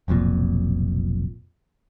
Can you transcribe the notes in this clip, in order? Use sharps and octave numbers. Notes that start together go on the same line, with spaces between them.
F1 B1 F2 A#2